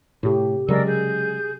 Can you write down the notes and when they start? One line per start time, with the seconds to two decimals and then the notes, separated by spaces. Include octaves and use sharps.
0.23 A2 C3 G4
0.68 C#3 F#3 G#3 A#4 D5 E6
0.88 G#4 G6